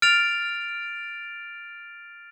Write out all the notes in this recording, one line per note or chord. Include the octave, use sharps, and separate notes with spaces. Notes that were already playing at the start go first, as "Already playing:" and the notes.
F6 A6 D7 F7